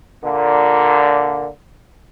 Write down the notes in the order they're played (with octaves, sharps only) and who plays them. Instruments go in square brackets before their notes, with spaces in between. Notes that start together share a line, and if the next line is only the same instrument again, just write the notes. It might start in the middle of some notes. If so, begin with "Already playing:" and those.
[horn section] A#2 D3